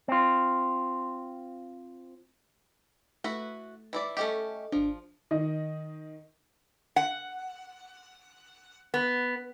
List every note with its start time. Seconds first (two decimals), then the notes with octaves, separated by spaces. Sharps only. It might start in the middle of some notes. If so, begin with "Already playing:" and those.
0.08 C4 F4
3.24 A3 E4 F#4 B4
3.93 E3 E4 D5
4.17 A3 C#4 G4 A4 D#5
4.72 G#1 F3 D4
5.31 D#3 D#5
6.96 F#5
8.94 B3